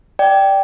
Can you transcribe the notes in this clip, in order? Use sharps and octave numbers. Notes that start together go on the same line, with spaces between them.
D5 G5